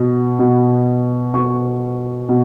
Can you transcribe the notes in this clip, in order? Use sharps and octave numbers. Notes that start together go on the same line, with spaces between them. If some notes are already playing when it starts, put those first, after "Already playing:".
Already playing: B2
B2
B2 C#6
B2